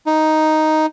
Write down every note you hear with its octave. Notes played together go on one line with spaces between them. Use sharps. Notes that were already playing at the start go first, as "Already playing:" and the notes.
D#4